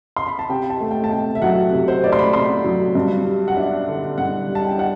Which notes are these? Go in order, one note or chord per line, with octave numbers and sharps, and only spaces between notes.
C6
B5
A5
C3 G5
A5
A3
G5
A5
C3 G5
E5
F#3 F#5
C3
C5
A3 D5
C6
B5
C3 C6
F#3
G2
G3
F#5
D4 E5
D3
G2 F#5
G3
A5
G5
D4 F#5